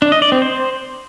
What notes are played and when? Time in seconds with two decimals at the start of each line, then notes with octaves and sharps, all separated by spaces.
0.02 D4
0.12 D#5
0.22 D5
0.32 C4
0.42 C5